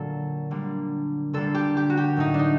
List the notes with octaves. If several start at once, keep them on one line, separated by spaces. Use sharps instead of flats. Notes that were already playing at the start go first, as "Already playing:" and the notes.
Already playing: A#2 D3 F#3 A#3 A4
D3 G3 A#3
D3 G3 A#3 A4
G4
G4
F#4
G4
A2 F#3 A3 D#4
D4
D#4